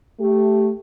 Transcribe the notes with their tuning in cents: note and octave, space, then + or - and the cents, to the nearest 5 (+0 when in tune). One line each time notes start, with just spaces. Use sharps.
A3 +0 G4 +0